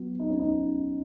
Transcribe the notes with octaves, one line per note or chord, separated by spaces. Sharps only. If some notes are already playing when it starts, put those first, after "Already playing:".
Already playing: F#3 B3
D#4
C#4
D#4